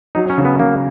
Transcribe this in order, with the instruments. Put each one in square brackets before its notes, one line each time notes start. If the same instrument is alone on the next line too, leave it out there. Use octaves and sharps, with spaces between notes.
[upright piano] F#3 [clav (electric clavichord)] D#4
[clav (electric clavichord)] C#4
[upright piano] C#3
[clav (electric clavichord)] B3
[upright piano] C#3 [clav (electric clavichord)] A#3